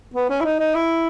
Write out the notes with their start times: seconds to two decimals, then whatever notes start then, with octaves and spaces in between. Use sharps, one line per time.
0.14 B3
0.30 C#4
0.40 E4
0.44 D#4
0.60 D#4
0.75 E4